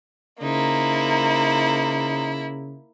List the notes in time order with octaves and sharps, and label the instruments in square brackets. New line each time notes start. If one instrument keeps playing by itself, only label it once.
[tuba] C#3 [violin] A#3 E4 [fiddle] D#4 C5